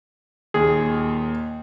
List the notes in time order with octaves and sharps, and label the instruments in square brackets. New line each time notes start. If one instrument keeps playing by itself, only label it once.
[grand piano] D#2 A#2 [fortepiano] G#4